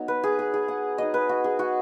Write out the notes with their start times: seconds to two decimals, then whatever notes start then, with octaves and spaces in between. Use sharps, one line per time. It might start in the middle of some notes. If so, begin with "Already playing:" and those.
Already playing: F#3 B3 D#4
0.08 B4
0.24 G#4
0.39 G#4
0.54 G#4
0.68 F#5
0.98 F#3 D#4 D#5
1.14 B4
1.29 F#4
1.44 G#4
1.59 F#4